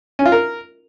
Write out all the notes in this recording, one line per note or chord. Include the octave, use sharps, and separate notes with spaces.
C#4
F4
A#4